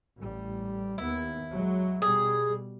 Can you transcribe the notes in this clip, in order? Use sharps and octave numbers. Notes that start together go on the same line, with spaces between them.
A1 G3
D#2 B3 E4
F#3 G#3
B2 G3 G#4